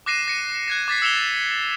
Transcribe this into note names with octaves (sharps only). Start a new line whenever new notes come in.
D6 F#6 A#6 C7 D#7 E7
A#6 C#7 D#7
F#6 G#6 A#6
D6 A6 B6 C7
E6 C7 C#7 E7 F7 G7